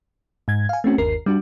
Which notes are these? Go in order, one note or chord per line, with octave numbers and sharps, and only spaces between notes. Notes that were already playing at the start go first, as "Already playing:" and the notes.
G#2 G#6
F5 G#5
A3 C4 C#4 F#4
G1 D#2 A#4 C7
G3 D4 F#4